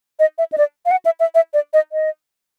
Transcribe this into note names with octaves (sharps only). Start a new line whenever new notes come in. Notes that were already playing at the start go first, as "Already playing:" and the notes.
D#5
E5
D#5
D5
F5
F#5
E5
E5
E5
D5
D#5
D#5